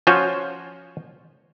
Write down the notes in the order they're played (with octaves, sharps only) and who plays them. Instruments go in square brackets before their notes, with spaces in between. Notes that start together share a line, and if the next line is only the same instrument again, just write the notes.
[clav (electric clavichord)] F3 C#4 F4 F#4 C5 C#5